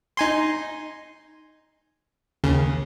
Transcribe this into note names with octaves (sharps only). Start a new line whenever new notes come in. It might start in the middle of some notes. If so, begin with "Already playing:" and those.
D#4 G#5 C6
D#2 C#3